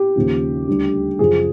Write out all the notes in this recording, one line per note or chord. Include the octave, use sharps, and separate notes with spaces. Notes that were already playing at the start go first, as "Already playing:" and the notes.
Already playing: G4
D#2 C#3 F3
D2 D3 G3
F#2 C#3 F3 G#4